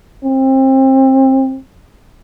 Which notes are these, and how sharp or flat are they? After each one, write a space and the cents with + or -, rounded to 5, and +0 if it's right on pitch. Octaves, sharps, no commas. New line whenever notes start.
C4 +30